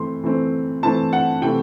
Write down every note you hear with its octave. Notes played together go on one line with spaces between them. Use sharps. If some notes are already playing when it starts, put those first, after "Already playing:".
Already playing: E3 A3 C4 C6
E3 A3 C4
E3 A3 C4 A5
F#5
C3 E3 A3 G5